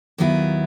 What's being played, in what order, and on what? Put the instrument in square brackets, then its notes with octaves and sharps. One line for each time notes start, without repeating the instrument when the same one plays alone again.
[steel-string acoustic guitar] D#2 D#3 F#3 B3 E4